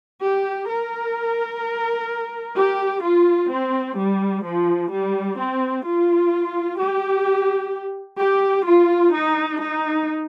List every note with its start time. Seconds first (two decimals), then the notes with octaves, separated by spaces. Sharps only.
0.22 G4
0.69 A#4
2.56 G4
3.03 F4
3.51 C4
3.97 G3
4.44 F3
4.91 G3
5.38 C4
5.85 F4
6.79 G4
8.19 G4
8.66 F4
9.13 D#4
9.60 D#4